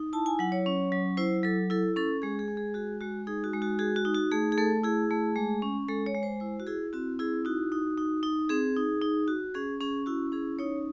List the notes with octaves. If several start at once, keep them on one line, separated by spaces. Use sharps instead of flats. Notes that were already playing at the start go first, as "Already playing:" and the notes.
Already playing: D#4
E4 A5
G#5
F#3 F#5
C#5
C#4
F#3
E4 C5
F#3 A4
E4 A4
C#4 A4
G#3 G#4
G#4
G#3
G#4
F#4 G#4
G#3 F#4
D#4 G#4
F#4
G#3
F#4
F#4 G#4
F#4
D#4
F#4
A3 G#4
G#4
A3 A4
E4 G#4
A3
G#3
C#4
G#3 A4
C#5
G#3
C5
E4 C5
F#4
E4 G#4
C4 F#4
E4 G#4
D#4 F#4
D#4
D#4
D#4
C4 G#4
D#4
D#4
F#4
C#4 G#4
C#4 G#4
E4 F#4
C#4 G#4
D#4 C#5